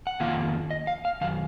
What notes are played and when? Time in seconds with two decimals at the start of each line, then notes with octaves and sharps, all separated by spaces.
0.07 F#5
0.20 F2 D#3 A#3 F4 F5
0.71 D#5
0.87 F5
1.05 F5
1.21 F#2 D#3 F5